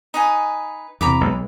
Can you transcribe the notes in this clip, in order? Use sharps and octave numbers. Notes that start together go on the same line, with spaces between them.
D#4 B4 G#5
E2 C3 A#5 B5 D6
B1 G#3